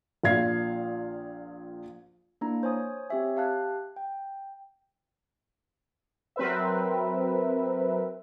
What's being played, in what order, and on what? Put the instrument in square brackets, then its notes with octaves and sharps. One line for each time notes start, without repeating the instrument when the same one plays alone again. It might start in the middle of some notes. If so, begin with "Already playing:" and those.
[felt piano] A#1 A#2 F5 G#6 C7
[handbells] A#3 D4 E4 A#5
C5 C#5 G#5 D#6
C4 G4 C#5 E5 G#5
G4 F5 A5 F#6
G5
[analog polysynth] F#3 C4 A#4 B4 E5